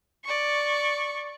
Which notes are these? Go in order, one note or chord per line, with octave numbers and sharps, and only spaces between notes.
D5 C#6